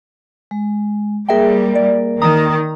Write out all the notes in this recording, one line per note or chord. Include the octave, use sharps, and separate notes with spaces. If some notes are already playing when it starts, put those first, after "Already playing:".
G#3
G3 A#3 G#4 A#4 E5 G5
D5
D#3 A#5 D#6